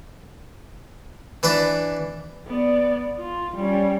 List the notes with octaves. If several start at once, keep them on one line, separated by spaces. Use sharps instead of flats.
E3 D4 E4 D5
B3 D5
F4
G3 C#4